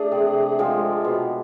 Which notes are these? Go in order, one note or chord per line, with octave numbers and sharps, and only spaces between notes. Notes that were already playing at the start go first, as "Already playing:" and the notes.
Already playing: A3 D4 G#4
C3
F3 G#3 C4
B2